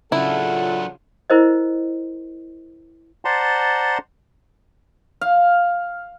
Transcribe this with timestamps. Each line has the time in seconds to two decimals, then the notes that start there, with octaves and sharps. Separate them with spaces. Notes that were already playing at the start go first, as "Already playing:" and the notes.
0.12 C#3 F#3 D4 E4 F4 A4 F#5
1.30 E4 A#4 C5 D#5
3.25 C5 D5 F#5 A5 A#5 C6
5.21 F5